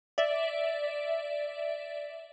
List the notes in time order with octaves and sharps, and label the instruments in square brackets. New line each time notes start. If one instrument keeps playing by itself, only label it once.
[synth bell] D5 E5